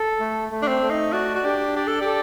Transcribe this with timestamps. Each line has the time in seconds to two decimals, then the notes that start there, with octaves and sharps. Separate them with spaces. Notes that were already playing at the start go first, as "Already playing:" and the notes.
Already playing: A4
0.20 A3
0.51 A3
0.62 D4
0.67 C4
0.82 A3
0.90 D#4
1.13 F#4 D5
1.35 F#4
1.44 D4 G4
1.76 G4 D5
1.87 A4
2.01 G4
2.06 A4